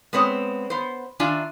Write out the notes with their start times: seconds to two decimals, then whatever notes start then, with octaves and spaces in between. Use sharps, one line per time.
0.13 G#3 B3 C4 C#5
0.70 B3 C5
1.20 D#3 D4 F4 E5 G#5